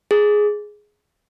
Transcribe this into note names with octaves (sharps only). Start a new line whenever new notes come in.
G#4